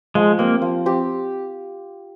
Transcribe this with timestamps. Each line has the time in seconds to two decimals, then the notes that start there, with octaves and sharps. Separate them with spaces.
0.15 F3 G#3
0.39 A#3 C4 G4 C5
0.62 F3
0.85 C4 G4 C5